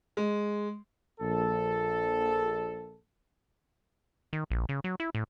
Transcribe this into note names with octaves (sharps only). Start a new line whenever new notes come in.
G#3
A#1 A4
D#3
A#1
C#3
F#3
E4
A2